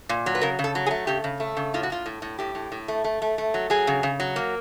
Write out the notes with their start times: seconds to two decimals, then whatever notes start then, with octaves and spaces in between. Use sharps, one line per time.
0.09 A#2
0.26 F#3
0.35 B4
0.41 C#3 A#4
0.59 C#3
0.64 A4
0.75 F#3
0.86 G#4
0.91 A3
1.07 C#3 G4
1.24 C#3
1.40 A3
1.57 C#3
1.74 A2 F4
1.83 F#4
1.90 A2 F4
2.06 A2
2.22 A2
2.39 A2 G4
2.55 A2
2.72 A2
2.88 A3
3.04 A3
3.22 A3
3.38 A3
3.54 F#3
3.70 F#3 G#4
3.87 C#3
4.03 C#3
4.20 F#3
4.36 A#3